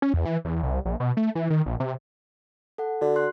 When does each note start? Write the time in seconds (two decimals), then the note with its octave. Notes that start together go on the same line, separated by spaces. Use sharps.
0.02 C#4
0.14 E2
0.25 E3
0.45 E2
0.63 C2
0.85 A#1
1.00 B2
1.17 A3
1.35 E3
1.50 D#3
1.66 A#1
1.80 C3
2.78 A4 F#5
3.01 D3 F#4
3.16 C6 F#6